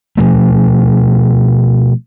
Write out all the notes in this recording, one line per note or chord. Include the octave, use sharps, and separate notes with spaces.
B2 F3 A3